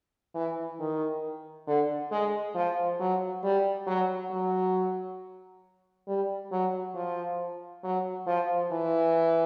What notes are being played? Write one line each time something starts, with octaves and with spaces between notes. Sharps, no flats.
E3
D#3
D3
G#3
F3
F#3
G3
F#3
F#3
G3
F#3
F3
F#3
F3
E3